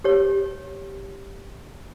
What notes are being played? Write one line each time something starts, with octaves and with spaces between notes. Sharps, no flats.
G4 C#5